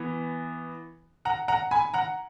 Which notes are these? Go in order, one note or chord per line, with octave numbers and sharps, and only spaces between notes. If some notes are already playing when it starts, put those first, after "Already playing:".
Already playing: E3 B3
F#5 A#5
F#5 A#5
G#5 B5
F#5 A#5